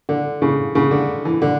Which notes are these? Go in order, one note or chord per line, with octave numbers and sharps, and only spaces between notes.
D3
C#3
C#3
D3
E3
D3